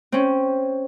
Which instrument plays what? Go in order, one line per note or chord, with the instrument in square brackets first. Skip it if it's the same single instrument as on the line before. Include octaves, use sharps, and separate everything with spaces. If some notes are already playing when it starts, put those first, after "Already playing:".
[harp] C4 C#4